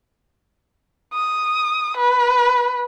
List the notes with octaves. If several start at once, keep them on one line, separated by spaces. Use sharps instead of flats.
D#6
B4